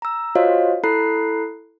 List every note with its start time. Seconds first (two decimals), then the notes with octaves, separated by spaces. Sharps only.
0.02 A#5 E6
0.35 F4 F#4 C5 C#5 D#5 F5
0.84 E4 A4 A#5 B5 F#6 C7